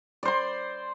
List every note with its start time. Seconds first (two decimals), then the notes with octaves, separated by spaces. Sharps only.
0.23 D5
0.25 C5
0.28 C6